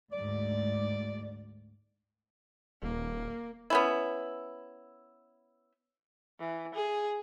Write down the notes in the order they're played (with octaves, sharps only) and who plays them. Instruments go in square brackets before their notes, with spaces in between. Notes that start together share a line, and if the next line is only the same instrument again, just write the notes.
[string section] D2 G#2 [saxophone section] D5
[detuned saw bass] D#1 [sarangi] A#3
[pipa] B3 C#4 E4
[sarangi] E3
G#4